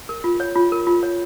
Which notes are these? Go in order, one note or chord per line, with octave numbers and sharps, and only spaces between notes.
A#4
F4
C#5
F4
A#4
F4
C#5